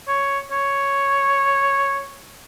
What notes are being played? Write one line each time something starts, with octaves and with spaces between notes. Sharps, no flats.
C#5
C#5